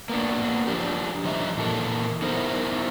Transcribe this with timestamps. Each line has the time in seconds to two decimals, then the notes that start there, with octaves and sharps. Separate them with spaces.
0.09 A#3 B3 D4
0.67 F3 D4 G4
1.25 F3 G3 D#4 E5
1.57 A#2 E3 A4 A#4
2.22 B3 D#4 E4 A#4 C5